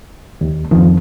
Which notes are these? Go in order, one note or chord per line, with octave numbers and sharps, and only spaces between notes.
D#2
F2 D#3 F3